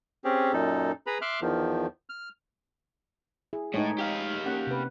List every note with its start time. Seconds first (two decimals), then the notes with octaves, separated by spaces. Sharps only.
0.24 C4 C#4 G4 G#4
0.53 F#2 A#2 D#4 A4
1.07 G#4 B4 A#5 B5
1.22 E5 C6 D6 F6 F#6
1.42 E2 D#3 F3
2.10 F6
3.53 E4 G#4
3.74 A2 G#3 D#4 G#4 B4 C#5
3.98 G4 F5
4.46 A#3 C#4 F#5
4.67 C3 B4